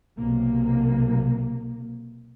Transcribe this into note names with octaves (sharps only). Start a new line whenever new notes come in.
B1 C3 A#3